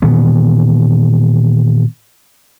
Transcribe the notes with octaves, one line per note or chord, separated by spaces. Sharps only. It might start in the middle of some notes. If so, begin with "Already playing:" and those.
A#2 D#3 E3 B3